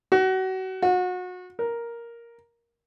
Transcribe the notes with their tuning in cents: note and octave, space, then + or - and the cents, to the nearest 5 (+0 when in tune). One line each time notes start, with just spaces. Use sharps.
F#4 +30
F#4 -30
A#4 +5